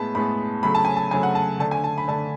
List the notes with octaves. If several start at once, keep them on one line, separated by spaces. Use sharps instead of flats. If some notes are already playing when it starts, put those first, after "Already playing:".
Already playing: A2 G#3 B3 A5 B5
A2 G#3 B3 B5
C#3 F#3 A3 B5
A5
G#5
A5
C#3 F#3 A3 G#5
F#5
A5
D3 A3 D4 A5
G#5
A5
B5
D3 A3 D4 A5